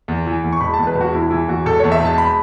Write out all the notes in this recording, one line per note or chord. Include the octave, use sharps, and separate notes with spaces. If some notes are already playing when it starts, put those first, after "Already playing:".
E2
E3
E2
C#6
E1 B5
A5
E2
B4
E1
F#4
E2 E4
E3 E4
E2 F#4
E1 A4
E2 C#5
E5
E1 A5
B5